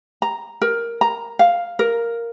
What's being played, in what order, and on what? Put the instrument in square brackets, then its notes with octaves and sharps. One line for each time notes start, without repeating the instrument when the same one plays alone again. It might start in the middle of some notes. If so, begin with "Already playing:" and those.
[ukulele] A#5
A#4
A#5
F5
A#4